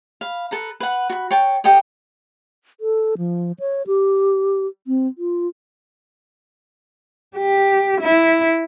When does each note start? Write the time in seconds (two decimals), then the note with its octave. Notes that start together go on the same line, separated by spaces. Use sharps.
0.21 F5 B5
0.51 A4 B4 A#5
0.80 B4 F#5
1.10 F#4 B5
1.31 C#5 G5 A5
1.64 G4 A4 D#5 G5
2.80 A4
3.18 F3
3.60 C#5
3.87 G4
4.87 C4
5.18 F4
7.37 G4
8.01 E4